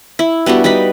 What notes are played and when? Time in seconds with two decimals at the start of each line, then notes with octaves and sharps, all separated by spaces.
0.19 E4
0.46 G3 B3 D4 F#4
0.64 G3 D#4 F#4 B5